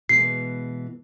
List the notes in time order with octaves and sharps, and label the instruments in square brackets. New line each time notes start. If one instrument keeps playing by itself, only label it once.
[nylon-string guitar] B2 E3 G#3 [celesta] C7